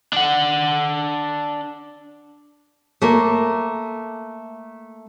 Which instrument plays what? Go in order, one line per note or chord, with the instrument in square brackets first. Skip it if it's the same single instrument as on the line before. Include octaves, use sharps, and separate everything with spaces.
[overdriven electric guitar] D4 F#5
[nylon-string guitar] A3 A#3